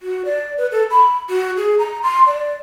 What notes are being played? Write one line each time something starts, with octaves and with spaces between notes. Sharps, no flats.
F#4
D5
B4
A4
B5
F#4
G#4
A#5
C6
D5